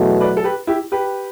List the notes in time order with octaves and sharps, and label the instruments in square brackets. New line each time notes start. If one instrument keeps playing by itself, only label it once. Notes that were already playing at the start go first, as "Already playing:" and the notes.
Already playing: [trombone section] E2 B2 F#3 A3
[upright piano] B4 D5
A4
G4 B4
E4 G4
G4 B4